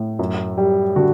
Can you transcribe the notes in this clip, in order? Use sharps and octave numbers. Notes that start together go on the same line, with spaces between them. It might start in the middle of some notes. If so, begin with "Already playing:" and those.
Already playing: A2
F#2
G3
D3 F#4